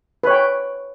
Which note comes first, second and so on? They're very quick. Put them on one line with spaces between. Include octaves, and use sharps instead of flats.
B4 C#5 G5